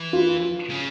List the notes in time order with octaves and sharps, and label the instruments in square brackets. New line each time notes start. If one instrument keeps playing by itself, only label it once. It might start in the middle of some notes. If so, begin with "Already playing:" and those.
Already playing: [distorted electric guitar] E3
[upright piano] F4
[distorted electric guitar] C#3